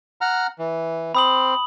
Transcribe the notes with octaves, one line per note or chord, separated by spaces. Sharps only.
F#5 A#5 F6
E3
C4 B5 D#6 F#7